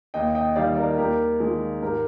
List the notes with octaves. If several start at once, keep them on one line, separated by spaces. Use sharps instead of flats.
D#2 D#5 G5
D#5 G5
D#3 G3 D5 F5
A#4 D5
D#2 G4 A#4
D#3 G#3
G#2 G4 A#4